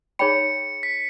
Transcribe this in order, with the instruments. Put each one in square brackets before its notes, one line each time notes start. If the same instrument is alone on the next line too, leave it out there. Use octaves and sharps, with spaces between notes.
[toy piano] D#4 G#4 C#5 G5 B5 [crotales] C#7
[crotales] B6